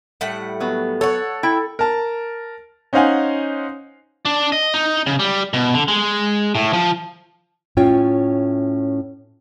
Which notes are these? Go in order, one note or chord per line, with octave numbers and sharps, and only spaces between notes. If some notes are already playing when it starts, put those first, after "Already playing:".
A2 G3 F#5
F#3 B3
A4 C#5 F#5
E4 G5
A#4 A5
C#4 D#4 C5 F5 F#5 G#5
D4
D#5
D#4
C#3
G3
B2
D3
G#3
A2
F3
A2 C#4 F4 C#5 G5